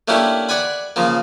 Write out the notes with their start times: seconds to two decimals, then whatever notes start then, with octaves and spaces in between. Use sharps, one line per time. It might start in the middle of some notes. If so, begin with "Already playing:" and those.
0.08 A3 A#3 C#4 D4 E4 G4
0.49 D5 F#5 G#5 B5
0.96 C#3 F3 A#3